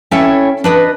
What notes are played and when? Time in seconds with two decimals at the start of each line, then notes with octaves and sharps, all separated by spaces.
0.11 C#4 E4 A4 C#5 E5 G5
0.64 D4 B4 D#5